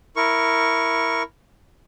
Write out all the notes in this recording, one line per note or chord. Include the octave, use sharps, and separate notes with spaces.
E4 A#4 C#6